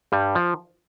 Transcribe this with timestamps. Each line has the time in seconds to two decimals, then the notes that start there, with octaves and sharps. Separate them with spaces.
0.12 G2 G3
0.35 F3